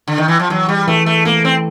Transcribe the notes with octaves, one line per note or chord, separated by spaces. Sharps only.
D3
D#3
E3
F3
E3 F#3
G3
E3 A3
A3
A3 A#3
C4